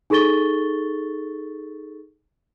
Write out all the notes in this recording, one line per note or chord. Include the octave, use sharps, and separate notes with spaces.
D#4 G#4 A4 C#6 A6 G7